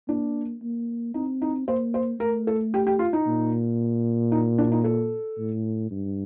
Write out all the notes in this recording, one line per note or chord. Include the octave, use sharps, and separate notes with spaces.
A#3 D4
A#3
C4 D#4
D#4
A#3 C5
C5
A3 A#4
A4
G4
G4
F4
D#4
A#2
D#4
D4
D#4
A4
A2
G2